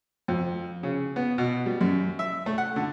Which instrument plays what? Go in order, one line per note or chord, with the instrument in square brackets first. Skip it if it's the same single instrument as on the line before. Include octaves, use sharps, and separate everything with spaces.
[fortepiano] F2
C#3
B3
B2
G3
F#2
E5
A3
F#5
D3